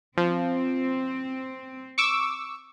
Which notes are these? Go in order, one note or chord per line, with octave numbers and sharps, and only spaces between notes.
F3 C4
C#6 D6 E6